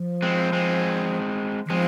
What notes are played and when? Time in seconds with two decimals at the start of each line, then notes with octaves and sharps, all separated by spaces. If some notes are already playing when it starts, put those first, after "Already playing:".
Already playing: F3
0.23 G#3 C4
0.53 G#3 C4
1.66 D#3
1.70 F3 G#3 C4